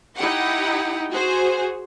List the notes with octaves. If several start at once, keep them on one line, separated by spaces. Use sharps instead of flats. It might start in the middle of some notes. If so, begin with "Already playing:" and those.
D#4 E4 G4 F#5
F#4 G#4 C5